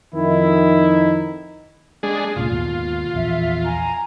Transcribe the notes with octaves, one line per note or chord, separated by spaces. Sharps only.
F2 D#3 D#4 E4
G#3 D4 G#4
C#2 A#2 C#3 F4
D#2 G#2 B2
A#1 E2 E5
G#5 A#5